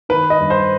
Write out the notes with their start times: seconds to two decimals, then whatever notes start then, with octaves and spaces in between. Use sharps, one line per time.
0.09 D#3 B4
0.30 D#5
0.40 G2
0.50 C5